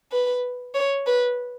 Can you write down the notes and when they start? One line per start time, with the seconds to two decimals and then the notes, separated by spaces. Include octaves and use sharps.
0.12 B4
0.74 C#5
1.06 B4